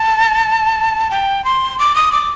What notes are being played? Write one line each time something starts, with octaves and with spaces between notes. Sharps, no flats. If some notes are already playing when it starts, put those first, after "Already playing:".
Already playing: A5
G5
C6
D6
D#6
D6